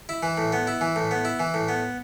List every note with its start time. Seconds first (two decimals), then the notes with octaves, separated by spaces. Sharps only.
0.09 E4
0.23 E3
0.38 A2
0.52 B3
0.67 E4
0.81 E3
0.96 A2
1.11 B3
1.25 E4
1.40 E3
1.54 A2
1.68 B3